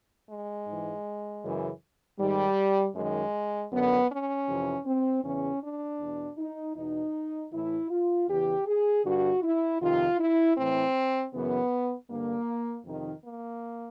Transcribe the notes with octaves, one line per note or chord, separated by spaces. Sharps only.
G#3
G#2 E3
F#2 C#3 E3
G#2 D#3 G3
F#2 D#3 G#3
F#2 D3 B3
C#4
F2 C3 E3
C4
E2 C#3 E3 C#4
D4
E2 B2
D#4
E2 B2 D#4
A2 E3 E4
F4
E2 C#3 E3 G4
G#4
G2 D3 F#4
E4
F2 C3 D#3 F4
E4
A2 E3 C4
F#2 C#3 E3 B3
G2 D3 A#3
F2 C3 D#3
A#3